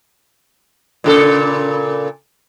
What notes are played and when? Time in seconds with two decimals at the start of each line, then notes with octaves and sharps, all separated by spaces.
1.04 A#2 C#3 A4